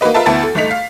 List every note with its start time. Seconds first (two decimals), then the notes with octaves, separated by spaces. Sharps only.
0.01 A#3 D#4 F#4 B4 D#5
0.14 F4 A#4 B4 D#5 E5 A5
0.26 D2 B3 E4 A5 A6
0.43 A4
0.55 G1 A3 D#4 B6 F7
0.71 F5